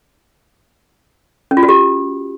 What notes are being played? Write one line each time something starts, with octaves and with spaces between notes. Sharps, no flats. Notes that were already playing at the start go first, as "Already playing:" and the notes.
C#4
F4
F#4
G4